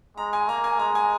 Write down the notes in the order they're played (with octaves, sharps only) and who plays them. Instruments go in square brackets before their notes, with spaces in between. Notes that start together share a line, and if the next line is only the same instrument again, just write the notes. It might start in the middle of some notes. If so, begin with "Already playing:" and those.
[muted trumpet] G#3 [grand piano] A#5
[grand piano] G#5
[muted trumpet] A#3 [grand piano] A#5
[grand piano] G#5
[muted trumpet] G#3 [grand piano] A#5
[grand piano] G#5